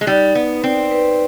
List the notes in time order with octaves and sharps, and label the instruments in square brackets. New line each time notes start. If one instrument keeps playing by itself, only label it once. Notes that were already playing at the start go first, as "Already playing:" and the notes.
[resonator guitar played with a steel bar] G#3
[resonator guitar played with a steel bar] G3 [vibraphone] D#4
[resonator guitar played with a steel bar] B3 [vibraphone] B4
[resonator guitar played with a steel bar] C4 [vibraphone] D5
[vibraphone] B4